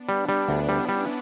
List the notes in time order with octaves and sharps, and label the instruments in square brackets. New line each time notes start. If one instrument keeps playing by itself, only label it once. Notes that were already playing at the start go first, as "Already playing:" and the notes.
Already playing: [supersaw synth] B3 D4
[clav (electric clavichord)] G3
G3
D2
[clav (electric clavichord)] G3 [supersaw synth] C#4 E4
[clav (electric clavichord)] G3